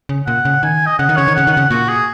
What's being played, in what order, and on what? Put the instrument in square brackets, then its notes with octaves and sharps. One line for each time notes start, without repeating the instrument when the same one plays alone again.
[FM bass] C#3
[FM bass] A#2 [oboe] F#5
[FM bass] C#3
[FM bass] D#3 [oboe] G#5
[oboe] D#5
[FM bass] C#3 [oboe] F#5
[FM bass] D#3
[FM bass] C#3 [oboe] C#5
[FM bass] D#3
[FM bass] C#3 [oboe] F#5
[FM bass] D#3
[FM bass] C#3 [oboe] F#5
[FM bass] A#2 [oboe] F#4
[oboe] G#4